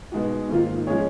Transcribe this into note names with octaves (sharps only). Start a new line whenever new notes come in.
B2 G#3 D#4 F#4
G#2 D#3 A#3 F4
F3 G#3 C#4 G#4 C#5